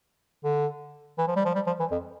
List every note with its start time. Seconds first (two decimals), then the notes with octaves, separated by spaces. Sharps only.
0.44 D3
1.18 E3
1.28 F3
1.36 G3
1.45 F3
1.55 G3
1.67 F3
1.80 E3
1.91 F2